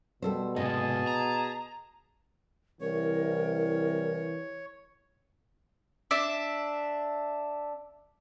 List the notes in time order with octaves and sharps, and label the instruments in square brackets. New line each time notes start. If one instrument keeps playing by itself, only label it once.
[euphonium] B2 [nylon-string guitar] G3 A4 C5
[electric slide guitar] G#2 C3 [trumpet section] G#4 A5 [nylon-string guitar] D#5
[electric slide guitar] A#5
[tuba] C2 [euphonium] E3 [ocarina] A#4 [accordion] C#5
[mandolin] D4 E5